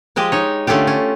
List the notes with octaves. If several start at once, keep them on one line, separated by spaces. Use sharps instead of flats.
F3 G#3 G4 D#5
D#4 C#5
D3 A3 C#4 F4 G4
C#4